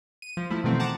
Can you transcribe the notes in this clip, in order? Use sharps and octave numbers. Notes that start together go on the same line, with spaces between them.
D#7
F3
F3 A3 E4
B2 D#3 E3 A3 C4
F#5 A5 A#5 D6